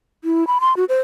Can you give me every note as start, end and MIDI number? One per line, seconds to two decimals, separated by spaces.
0.24 0.47 64
0.47 0.58 83
0.61 0.76 84
0.77 0.85 66
0.89 1.01 72